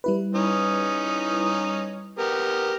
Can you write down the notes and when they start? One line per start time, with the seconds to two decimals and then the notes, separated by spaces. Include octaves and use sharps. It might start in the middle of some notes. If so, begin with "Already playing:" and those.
0.04 G3 E4 B4
0.35 C#4 D#4
2.19 B3 G4 A#4